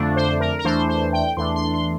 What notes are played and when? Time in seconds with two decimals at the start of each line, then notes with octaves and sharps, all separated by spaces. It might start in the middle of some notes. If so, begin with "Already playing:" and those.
Already playing: F2 D3 A3 D4
0.16 C5
0.40 A#4
0.59 A#4
0.64 E2 E3 A3 D4 C5
0.89 C5
1.13 G5
1.37 E2 E3 A3 D4 C6
1.56 C6
1.74 C6